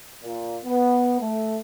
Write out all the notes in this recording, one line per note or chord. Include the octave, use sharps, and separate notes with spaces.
A#2
B3
A3